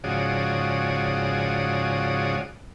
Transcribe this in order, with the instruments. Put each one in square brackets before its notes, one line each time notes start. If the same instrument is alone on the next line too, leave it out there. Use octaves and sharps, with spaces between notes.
[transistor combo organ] G#2 C#3 F3 F#4 D5 D#6